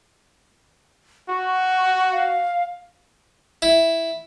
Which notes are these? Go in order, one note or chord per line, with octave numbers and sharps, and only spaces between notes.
F#4 C#6
F5
E4